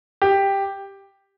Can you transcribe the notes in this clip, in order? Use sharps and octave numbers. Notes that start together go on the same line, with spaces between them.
G4